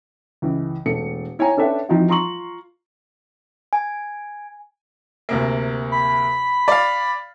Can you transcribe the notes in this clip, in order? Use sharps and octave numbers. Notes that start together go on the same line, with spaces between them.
C#2 E3
E1 A3 A4 C#7
E4 C#5 G5 G#5 A#5
C#4 D4 A4 B4 E5 G5
E3 F3 C4 D#4 E4 F#4
F4 A#5 C6 C#6 F#7
G#5
D2 C3 A#3
B5
D5 F5